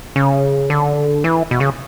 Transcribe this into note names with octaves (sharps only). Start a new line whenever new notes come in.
C#3
D3
E3
B2
C#3